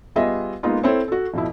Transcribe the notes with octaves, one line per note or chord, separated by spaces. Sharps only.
G3 B3 F4 G#4 D#5 E5
G#3 A#3 B3 D#4 F4
C4 E4 A4 C5 C#5
F#4 A4
F2 B2 E4